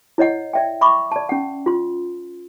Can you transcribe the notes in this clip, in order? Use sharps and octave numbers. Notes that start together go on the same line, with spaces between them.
E4 C#5 D#5 F#5
D5 E5 G5
E5 B5 C#6 D6
D5 A5
C#4 F#5
F4 C6